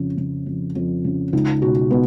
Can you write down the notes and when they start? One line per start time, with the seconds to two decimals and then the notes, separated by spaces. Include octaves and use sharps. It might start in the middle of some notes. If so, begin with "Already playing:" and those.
Already playing: F2 C#3
0.17 C#3
0.46 F2
0.75 F2
1.04 C#3
1.33 C#2 D#4
1.62 B2 F#4
1.91 B2 B3